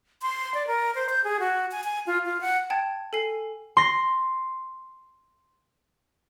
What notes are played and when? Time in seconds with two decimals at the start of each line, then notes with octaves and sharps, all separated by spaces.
0.22 C6
0.54 D5
0.67 A#4
0.95 C5
1.09 G6
1.24 G#4
1.40 F#4
1.71 G#5
1.84 G#5
2.07 F4
2.25 F4
2.41 F#5
2.70 G5 A5 G#6 A6
3.13 A4 G#5 C7
3.77 C6 A#6